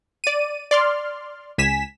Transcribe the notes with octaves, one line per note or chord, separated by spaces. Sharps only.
D5 D#7
D5 C6 F6
C#2 G#5 B6 E7